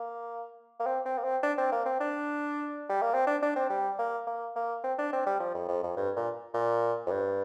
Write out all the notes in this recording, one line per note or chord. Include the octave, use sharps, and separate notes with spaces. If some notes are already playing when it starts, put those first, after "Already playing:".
Already playing: A#3
A#3
C4
C4
A#3
C4
D4
C4
A#3
C4
D4
G3
A#3
C4
D4
D4
C4
G3
A#3
A#3
A#3
C4
D4
C4
G3
F3
F2
F2
F2
G2
A#2
A#2
F2
G2